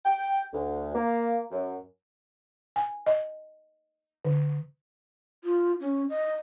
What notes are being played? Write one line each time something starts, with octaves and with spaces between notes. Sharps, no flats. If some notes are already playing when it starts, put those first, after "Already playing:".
G5
D2
A#3
F#2
G#5
D#5
D3
F4
C#4
D#5